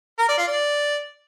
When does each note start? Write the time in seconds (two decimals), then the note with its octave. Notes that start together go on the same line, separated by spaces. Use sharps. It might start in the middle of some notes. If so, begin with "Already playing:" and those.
0.19 A#4
0.28 D5
0.38 F4
0.48 D5